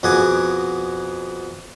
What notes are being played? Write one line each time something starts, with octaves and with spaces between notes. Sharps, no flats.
F2 B2 G#4 F#5 G#5 D6